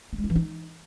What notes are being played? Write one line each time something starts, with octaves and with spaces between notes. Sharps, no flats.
A#3
G#3
E4
E3
D#4